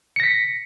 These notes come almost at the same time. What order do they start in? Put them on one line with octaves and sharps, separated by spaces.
C#7 A#6 B6